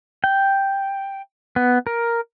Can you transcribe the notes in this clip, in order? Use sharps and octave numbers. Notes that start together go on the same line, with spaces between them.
G5
B3
A#4